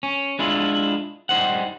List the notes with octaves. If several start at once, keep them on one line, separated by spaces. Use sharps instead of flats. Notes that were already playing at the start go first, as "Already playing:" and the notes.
C#4
G#3 D4 E4 F4
G3 D#4 C5 F#5